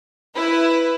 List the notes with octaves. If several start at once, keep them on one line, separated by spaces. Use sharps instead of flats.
E4 B4